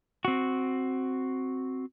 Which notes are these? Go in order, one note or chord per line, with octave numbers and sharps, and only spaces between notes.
C4 F#4